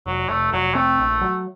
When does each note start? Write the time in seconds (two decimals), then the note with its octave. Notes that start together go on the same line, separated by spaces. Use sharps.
0.06 F1 F#3
0.29 F1 A3
0.52 F1 F#3
0.75 A3 C4
0.98 A#1
1.21 F#3